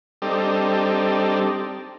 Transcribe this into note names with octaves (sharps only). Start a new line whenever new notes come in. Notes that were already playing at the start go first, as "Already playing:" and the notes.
G3 C4 D4 D#4 G4 A4